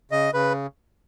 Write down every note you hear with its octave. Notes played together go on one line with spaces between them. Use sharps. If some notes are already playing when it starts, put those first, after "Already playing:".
C#3 D#5
C#3 B4